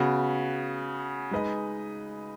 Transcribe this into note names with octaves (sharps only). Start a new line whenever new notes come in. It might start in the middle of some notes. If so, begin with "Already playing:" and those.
Already playing: C#3 B3 F#4
G#3 D#4 B4 D#5